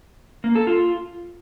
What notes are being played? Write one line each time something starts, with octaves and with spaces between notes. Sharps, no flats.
A#3
A4
F4